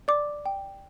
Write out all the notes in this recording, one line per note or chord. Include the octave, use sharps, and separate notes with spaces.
D5 D6
G5